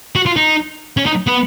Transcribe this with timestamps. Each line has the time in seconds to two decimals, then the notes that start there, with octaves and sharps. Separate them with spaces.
0.16 F#4
0.26 F4
0.36 D#4
0.97 C#4
1.06 D#4
1.27 B3